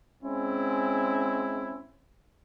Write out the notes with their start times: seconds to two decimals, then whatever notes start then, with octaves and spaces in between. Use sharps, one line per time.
0.23 G#3 C4 C#4 E4